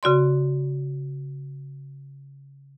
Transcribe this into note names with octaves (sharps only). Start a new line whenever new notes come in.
C#3 F#4 D5 C6